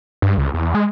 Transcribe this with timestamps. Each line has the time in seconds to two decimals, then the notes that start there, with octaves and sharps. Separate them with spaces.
0.22 G2
0.38 C#2
0.54 E2
0.75 G#3